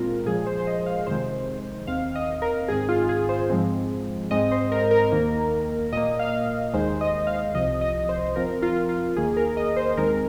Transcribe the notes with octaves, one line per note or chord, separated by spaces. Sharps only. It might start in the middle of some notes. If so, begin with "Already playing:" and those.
Already playing: A#2 G#3 C4 F4 A#4
A#2 F3 G#3 G#4
C5
C5
D#5
F5
F2 C3 D#3 G#3 C5
D#2 D#3 C4 F5
D#5
A#4
G#2 D#3 C4 G#4
F4
G#4
C5
G#2 F3 G#3 C4
G#2 G#3 C4 D#5
C5
A#4
A#4
D#2 D#3 A#3
A#2 A#3 D#5
F5
D#2 D#3 G#3 C5
D#5
F5
C2 C3 F3 D#5
D#5
C5
F2 F3 C4 A#4
F4
F4
D#2 D#3 A#3 G#4
A#4
D#5
C5
D#2 D#3 G#3 C4 A#4